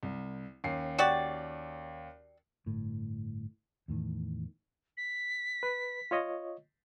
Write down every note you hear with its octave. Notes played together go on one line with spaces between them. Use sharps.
C2
D#2 C#4 C7
F#4 G4 D5
G1 A2
E2 A2 D#3
B6
B4
F4 C#5 D#5